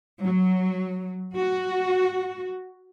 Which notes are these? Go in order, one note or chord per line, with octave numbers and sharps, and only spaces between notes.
F#3
F#4